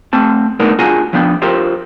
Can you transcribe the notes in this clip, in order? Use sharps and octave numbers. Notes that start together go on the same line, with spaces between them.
A3 C4 A5
G#3 A3 B3 D4 D#4 A#4
D4 F4 F#4 G#4 G#5 A#5
F3 B3 D4 G5
F4 G4 A#4 C5